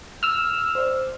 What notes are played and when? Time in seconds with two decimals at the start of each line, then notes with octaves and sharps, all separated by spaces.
0.23 E6 F6
0.75 C5 D5